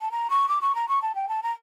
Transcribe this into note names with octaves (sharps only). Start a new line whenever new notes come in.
A5
A#5
C#6
D6
C#6
A#5
C#6
A5
G5
A5
A#5